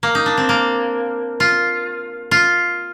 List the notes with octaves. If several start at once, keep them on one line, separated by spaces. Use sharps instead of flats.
A#3
D#4
D4
C4
A#3
F4
F4